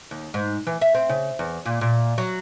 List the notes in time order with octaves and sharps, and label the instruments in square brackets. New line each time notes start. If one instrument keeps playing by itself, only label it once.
[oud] D#2
G#2
E3
E5
C4
C#3
E2
A#2
A#2
F#3